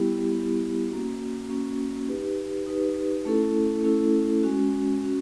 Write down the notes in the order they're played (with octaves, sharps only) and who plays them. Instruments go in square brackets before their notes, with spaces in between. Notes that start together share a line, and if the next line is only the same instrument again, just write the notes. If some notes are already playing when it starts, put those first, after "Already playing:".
Already playing: [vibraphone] G3 B3 E4 G4
G3 B3 E4 G4
A#3 C#4 F#4
A#3 C#4 F#4
D#4 G4 B4
D#4 G4 B4
A3 C#4 E4 A4
A3 C#4 E4 A4
G#3 C#4 F#4
C#4 F#4